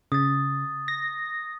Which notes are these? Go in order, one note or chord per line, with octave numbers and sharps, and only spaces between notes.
C#3 D#6 A6
A#6